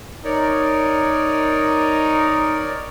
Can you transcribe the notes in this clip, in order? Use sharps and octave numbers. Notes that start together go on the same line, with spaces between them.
D#4 A#4 C#5 D5